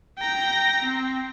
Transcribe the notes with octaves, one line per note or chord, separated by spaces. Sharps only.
G5 A#5
C4